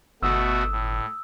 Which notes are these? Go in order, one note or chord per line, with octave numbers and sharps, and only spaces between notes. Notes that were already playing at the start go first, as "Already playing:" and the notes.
G1 B2 A3 F#4 D#6 E6
A2